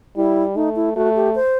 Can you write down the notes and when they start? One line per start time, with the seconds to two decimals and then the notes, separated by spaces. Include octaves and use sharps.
0.16 G3 E4
0.55 A3 D#4
0.76 E4
0.96 A3 F#4
1.16 G4
1.35 C5